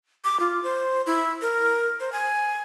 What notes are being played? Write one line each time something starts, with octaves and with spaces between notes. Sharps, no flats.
D6
F4
C5
E4
A#4
C5
G#5